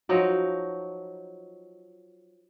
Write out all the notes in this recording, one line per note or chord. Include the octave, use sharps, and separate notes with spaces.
F3 F#3 D#4 F#4